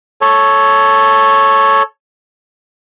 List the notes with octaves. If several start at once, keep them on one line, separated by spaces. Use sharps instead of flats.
A4 C#5